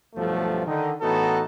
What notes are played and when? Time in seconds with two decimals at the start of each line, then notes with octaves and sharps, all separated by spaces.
0.15 B1 G2 F3 A3
0.66 D3 D#3 D#4
1.01 A2 E3 B3 D#4 F#4 A4